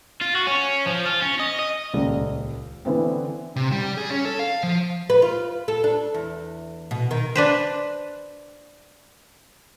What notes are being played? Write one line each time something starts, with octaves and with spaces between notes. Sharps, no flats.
F4
F#4
C#4
F3
F4
C#4
D#5
D#5
D#1 C#2 A4 D5
D3 E3 B3 C4
C3
G3
G#4
C#4
A4
F5
F3
B4
F4
A4
D4
E2
B2
D#3
D4 B4 C5